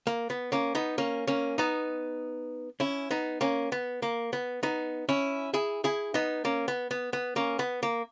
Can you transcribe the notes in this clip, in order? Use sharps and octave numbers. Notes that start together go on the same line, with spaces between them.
A#3
B3
A#3 C#4
B3 D#4
A#3 C#4
A#3 C#4
B3 D#4
C#4 E4
B3 D#4
A#3 C#4
B3
A#3
B3
B3 D#4
C#4 E4
E4 G#4
E4 G#4
B3 D#4
A#3 C#4
B3
B3
B3
A#3 C#4
B3
A#3